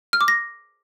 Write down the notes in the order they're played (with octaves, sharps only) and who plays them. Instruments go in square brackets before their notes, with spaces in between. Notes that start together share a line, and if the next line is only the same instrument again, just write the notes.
[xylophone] F6
D6
A#6